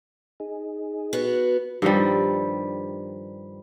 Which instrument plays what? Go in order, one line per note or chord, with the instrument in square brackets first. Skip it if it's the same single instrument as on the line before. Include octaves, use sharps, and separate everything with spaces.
[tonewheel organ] D#4 G#4
[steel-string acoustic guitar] B3 F#4
[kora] G2 D#3 F3 G3